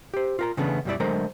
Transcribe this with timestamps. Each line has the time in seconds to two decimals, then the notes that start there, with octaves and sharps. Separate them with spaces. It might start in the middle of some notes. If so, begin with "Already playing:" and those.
0.14 G4 C5
0.39 F4 A#4 A#5
0.57 C#3 E3 A3 B3 C#4 D4
0.85 F#2 B2 G3 C#4 E4 D5
1.00 D3 F#3 G#3 A3 A#4 C5